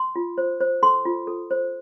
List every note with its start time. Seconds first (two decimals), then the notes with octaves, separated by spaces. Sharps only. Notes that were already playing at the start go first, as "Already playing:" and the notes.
Already playing: C6
0.16 F4
0.38 C5
0.61 C5
0.83 A4 C6
1.05 F4
1.27 A4
1.51 C5